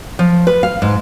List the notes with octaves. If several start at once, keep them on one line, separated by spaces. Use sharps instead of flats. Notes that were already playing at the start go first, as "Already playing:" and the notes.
F3
B4
F5
G#2